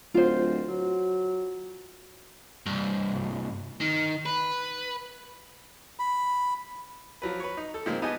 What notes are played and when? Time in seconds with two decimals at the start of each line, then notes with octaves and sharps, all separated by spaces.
0.14 D1 F4 C5
0.68 F#3
2.66 C2 G2
3.81 D#3
4.26 B4
5.99 B5
7.22 F3 F#3 B4
7.40 B4 C#5
7.57 D#4
7.74 A4
7.86 A#2 D#3 F3 G#3 A#3 C4
8.02 B3 D#4 G4 D#5 G#5 A5